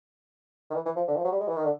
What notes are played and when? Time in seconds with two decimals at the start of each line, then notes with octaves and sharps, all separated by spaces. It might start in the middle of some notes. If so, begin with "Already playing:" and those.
0.70 D#3
0.75 E3
0.85 E3
0.96 F3
1.07 D3
1.16 F3
1.24 F#3
1.32 G3
1.40 G#3
1.48 E3
1.56 D#3
1.64 D3